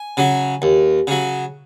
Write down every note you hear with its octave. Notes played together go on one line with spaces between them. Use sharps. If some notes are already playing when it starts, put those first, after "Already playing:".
Already playing: G#5
C#3 F#3
D#2
C#3 F#3